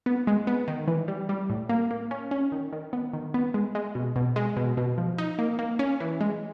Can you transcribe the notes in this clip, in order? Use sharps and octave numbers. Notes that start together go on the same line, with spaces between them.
B3
G#3
B3
D#3
E3
G3
G3
A2
A#3
A#3
C#4
C#4
D#3
D#3
B3
D#3
B3
G#3
G#3
B2
B2
G#3
B2
B2
F3
D#4
A#3
A#3
C#4
E3
G#3